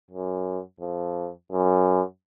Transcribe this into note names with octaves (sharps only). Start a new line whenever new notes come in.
F#2
F2
F#2